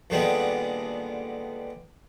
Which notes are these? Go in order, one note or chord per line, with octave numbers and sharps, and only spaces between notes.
D#2 A#2 D3 G3 G#3 B3